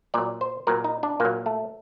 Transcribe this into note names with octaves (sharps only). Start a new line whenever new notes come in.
A#2 F#3 D5
C5
A#2 F#3 A#4
D#4
D4
A#2 F#3 A#3
A3